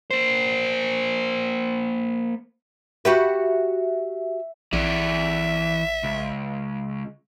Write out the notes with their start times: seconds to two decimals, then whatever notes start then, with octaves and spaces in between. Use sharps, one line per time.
0.11 A#3 C5
3.05 F#4 G4 B4 E5
4.73 A#1 E3 D5 E5
6.03 C#2